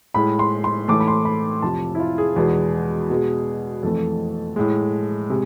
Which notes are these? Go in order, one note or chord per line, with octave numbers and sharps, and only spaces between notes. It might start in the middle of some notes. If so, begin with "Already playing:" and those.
A2 G#3 B5
C6
C6
A2 E3 A3 D6
B5
C6
B5
F2 C3 F3 A5
E4
F4
G#4
E2 B2 G#3
B2 G#3
F2 E3 A3 A4
A2 G#3
C3 G#3